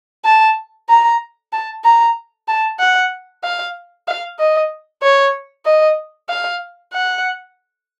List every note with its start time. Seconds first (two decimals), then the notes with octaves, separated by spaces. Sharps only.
0.25 A5
0.89 A#5
1.52 A5
1.84 A#5
2.48 A5
2.79 F#5
3.43 F5
4.08 F5
4.39 D#5
5.03 C#5
5.66 D#5
6.29 F5
6.93 F#5